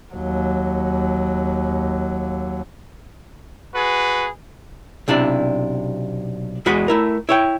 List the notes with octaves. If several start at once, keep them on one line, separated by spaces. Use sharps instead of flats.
D#2 F#3
F#4 G#4 B4
B1 C3 D4 E4 D5
E2 G#3 F#4 D#5 B5
A3 E4 A#4
E4 C#5 G5